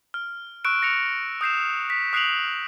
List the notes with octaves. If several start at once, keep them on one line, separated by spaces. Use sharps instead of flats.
F6
C#6 E6 F#6 D7 E7
A#6 C#7 F7
D#6 G6 C7 E7
B6
D#6 F#6 C7 D7 F7 F#7